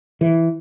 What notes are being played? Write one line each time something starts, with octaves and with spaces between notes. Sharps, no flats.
E3